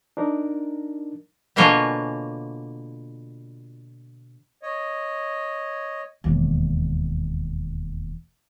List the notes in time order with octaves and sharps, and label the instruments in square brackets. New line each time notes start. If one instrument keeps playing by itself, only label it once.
[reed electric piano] D4 D#4 A#4
[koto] B2 D3 A#3 F4 C#5 G#5
[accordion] C#5 D#5
[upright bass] E1 D#2